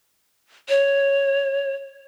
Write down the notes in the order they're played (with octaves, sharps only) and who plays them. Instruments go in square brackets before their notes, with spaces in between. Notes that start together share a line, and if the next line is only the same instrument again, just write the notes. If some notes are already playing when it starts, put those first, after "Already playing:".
[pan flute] C#5